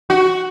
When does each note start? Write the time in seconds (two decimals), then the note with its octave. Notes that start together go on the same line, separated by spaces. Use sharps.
0.10 F#4